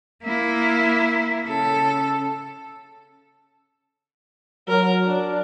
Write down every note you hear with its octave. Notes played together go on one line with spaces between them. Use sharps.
A#3 E4
C#3 A4
F#3 A#4
D4